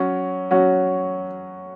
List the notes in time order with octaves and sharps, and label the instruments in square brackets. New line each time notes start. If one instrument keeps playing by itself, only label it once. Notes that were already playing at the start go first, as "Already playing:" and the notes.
Already playing: [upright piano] F#3 C#4 F#4
F#3 C#4 F#4